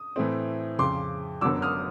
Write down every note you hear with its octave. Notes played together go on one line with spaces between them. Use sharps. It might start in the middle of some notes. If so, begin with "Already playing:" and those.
Already playing: D#6
A2 E3 A3 C4
F2 C#3 F3 C6 D6
G1 F#2 D3 F#3 B3 D6 E6
D#6 F6